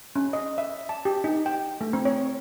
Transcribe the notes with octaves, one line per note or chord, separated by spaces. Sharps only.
C#4
D#5
E5
A5
G4
D#4
G5
A3
C4
C#5